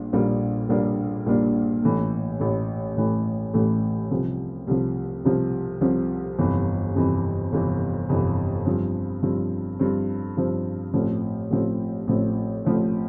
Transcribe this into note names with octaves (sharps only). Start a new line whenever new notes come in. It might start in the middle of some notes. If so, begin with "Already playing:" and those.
Already playing: A#1 A#2 G3 D4
A#1 A#2 G3 A#3 D4
A#1 A#2 G3 A#3 D4
A#1 A#2 G3 A#3 D4
A1 A2 E3 A3
A1 A2 E3 A3
A1 A2 E3 A3
A1 A2 E3 A3
C2 C3 F3
C2 C3 F3
C2 C3 F3
C2 C3 F3
G1 F2 C3 E3
G1 F2 C3 E3
G1 F2 C3 E3
G1 F2 C3 E3
G2 F3 C4
G2 F3 C4
G2 F3 C4
G2 F3 C4
A1 A2 F3 C4
A1 A2 F3 C4
A1 A2 F3 C4
A1 A2 F3 C4